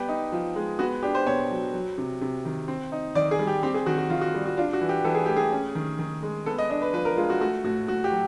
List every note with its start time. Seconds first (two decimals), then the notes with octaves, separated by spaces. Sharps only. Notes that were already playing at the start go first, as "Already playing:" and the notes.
Already playing: G3 B3 G4
0.09 D#4
0.32 F3
0.56 G#3
0.79 B3 F#4
1.03 D4 G4
1.15 C5
1.26 B2 C#5
1.50 F#3
1.73 F#3
1.98 C3
2.21 C3
2.45 D#3
2.68 C4
2.92 D#4
3.15 D#3 D5
3.31 G#4
3.39 G3
3.47 G4
3.63 C4 G4
3.74 G#4
3.86 D#3 F#4
3.98 F#4
4.10 D#3 F4
4.21 F#4
4.34 G3
4.46 F#4
4.57 D4 F4
4.73 F#4
4.81 E3
4.89 G4
5.04 E3 A4
5.15 G#4
5.26 A3 G4
5.36 G#4
5.52 C#4
5.75 D#3
5.99 D#3
6.23 G#3
6.46 B3 A4
6.58 D#5
6.70 D4 D#5
6.82 B4
6.93 F3 B4
7.05 A#4
7.17 G#3 F4
7.30 F#4
7.41 A3 F#4
7.64 A2 F#4
7.88 A2 F#4
8.04 G4
8.12 F#3